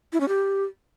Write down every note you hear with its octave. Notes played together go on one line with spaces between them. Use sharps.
E4
C#4
G4